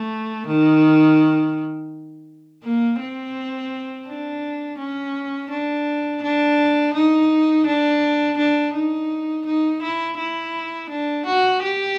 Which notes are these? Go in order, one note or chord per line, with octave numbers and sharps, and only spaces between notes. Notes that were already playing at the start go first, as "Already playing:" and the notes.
Already playing: A3
D#3
A#3
C4
D4
C#4
D4
D4
D#4
D4
D4
D#4
D#4
E4
E4
D4
F#4
G4